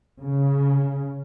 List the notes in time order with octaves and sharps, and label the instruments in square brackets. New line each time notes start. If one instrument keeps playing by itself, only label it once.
[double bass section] C#3